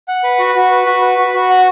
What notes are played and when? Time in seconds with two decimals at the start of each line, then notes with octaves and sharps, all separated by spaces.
0.08 F#5
0.24 B4
0.39 F#4
0.55 F#4
0.71 B4
0.86 F#4
1.02 B4
1.18 F#4
1.34 F#4
1.50 F#5